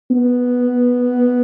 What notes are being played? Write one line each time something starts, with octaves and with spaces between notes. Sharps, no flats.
B3